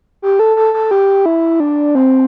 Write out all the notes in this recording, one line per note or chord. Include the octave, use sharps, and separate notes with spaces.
G4
A4
A4
A4
G4
E4
D4
C4